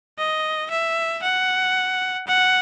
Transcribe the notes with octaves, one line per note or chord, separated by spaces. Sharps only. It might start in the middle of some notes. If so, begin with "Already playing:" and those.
D#5
E5
F#5
F#5